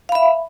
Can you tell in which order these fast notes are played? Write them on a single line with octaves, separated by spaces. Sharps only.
F5 B5 E5